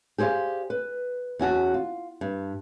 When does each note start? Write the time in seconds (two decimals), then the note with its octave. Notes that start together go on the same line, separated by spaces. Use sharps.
0.18 G4 G#4 C5 D5 F5
0.70 B4
1.39 E2 C#4 F#4 A5
1.74 F4
2.21 G2